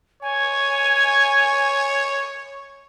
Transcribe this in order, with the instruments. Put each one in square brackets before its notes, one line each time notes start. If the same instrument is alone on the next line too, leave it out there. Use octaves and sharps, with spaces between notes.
[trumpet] C#5 [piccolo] G#5